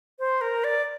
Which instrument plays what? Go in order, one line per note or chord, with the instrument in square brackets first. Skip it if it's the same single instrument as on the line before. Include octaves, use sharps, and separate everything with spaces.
[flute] C5
A#4
D5